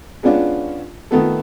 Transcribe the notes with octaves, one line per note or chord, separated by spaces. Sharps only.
G#3 B3 C#4 D4 F4
D#3 A3 B3 A4